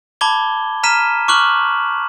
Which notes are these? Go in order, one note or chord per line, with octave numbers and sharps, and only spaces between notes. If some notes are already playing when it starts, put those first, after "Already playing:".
A5 B5 D6 G#6 G7
A#5 F6 B6 D#7 E7
C#6 D6 F6 F#6 F#7